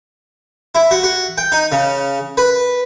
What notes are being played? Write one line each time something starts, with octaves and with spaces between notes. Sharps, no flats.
E4
F#4
F#4
G5
D#4
C#3
B4